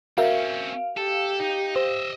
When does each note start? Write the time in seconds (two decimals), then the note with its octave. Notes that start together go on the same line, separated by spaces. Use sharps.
0.18 C4 C#4 F#4 A#4 E5 F5
0.98 G4 A4
1.40 D#4
1.76 C5 D#5 E5